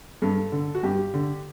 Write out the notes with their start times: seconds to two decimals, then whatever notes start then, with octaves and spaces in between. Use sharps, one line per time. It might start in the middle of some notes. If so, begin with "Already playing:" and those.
0.22 G2 A4
0.52 D3
0.75 F#4
0.83 G2 G4
1.14 D3